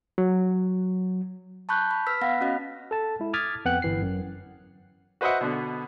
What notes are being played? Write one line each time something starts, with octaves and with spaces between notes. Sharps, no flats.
F#3
A5 B5 C#6 F#6 G6
B5
B4 E6 F6 B6
B3 F5 F#5 B5 A#6
C#4 F#4 D#5
A4 A5
G#3 E4
D6 D#6 F6 G#6 A6 B6
F2 B3 F#5 G5 F#6
G1 E3 C7
F#2
F#4 B4 C5 D#5 E5 F#5
B2 D3 B3